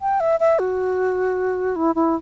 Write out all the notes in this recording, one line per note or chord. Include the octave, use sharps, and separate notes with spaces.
G5
E5
E5
F#4
E4
E4